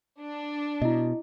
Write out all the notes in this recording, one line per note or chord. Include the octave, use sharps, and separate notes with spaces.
D4
B2 E4 D#5